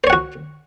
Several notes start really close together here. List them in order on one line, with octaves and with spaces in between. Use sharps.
C5 C#5 F#5 F#4